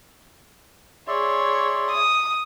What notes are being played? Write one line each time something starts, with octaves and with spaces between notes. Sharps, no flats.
G#4 C#5 D5 E5 C6
D#6